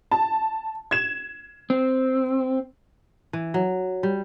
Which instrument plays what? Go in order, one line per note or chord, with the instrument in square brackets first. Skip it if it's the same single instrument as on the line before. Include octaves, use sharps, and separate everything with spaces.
[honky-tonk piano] A5
G#6 E7
[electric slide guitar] C4
[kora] E3
F#3
G3